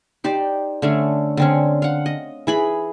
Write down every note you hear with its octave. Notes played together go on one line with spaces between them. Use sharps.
D#4 G4 C5 D5
D3 A3 C#4
D3 C4 C#4
F5 F#5
D#5
E3 G#4 B5